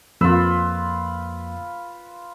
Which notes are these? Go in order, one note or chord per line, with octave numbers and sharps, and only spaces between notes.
F2 A#3 F4 B4 E6